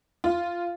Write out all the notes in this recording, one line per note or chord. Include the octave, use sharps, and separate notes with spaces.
F4